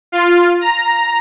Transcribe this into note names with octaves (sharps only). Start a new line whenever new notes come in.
F4
A#5